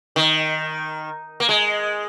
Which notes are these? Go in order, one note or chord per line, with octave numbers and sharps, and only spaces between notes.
D#3
A#3
G#3